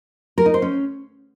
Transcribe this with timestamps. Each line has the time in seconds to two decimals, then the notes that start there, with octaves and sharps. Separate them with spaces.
0.38 A#4
0.46 D#4
0.54 C5
0.62 C#4